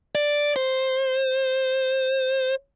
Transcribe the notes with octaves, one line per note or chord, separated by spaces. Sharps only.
D5
C5